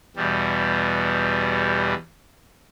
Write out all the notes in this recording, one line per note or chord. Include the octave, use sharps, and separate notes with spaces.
E2 B2 G3